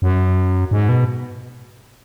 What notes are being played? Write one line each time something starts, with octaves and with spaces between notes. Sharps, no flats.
F#2
G#2
B2